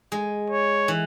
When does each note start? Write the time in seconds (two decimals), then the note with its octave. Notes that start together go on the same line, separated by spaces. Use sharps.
0.12 G#3
0.50 C#5
0.88 E3